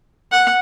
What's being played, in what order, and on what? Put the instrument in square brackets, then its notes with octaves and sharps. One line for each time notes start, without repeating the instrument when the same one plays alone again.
[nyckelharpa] F#5